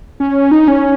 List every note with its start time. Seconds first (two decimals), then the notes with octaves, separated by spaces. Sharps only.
0.20 C#4
0.51 D#4
0.68 C#4